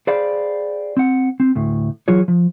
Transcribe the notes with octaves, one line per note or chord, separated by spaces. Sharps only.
G#4 C5 D5 F5 G5 B5
C4 F#5
C4
D2 A2
E3 F#3 F4 G#4 C#5
F3